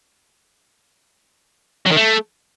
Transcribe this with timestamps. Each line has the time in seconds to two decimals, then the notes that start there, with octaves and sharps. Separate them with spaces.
1.86 F#3
1.92 D#3
1.97 A3